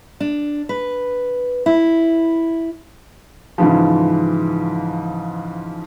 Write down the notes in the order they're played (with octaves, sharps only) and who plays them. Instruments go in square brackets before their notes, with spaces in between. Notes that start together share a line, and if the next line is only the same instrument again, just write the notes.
[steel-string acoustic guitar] D4
B4
E4
[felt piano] G#2 C#3 E3 F3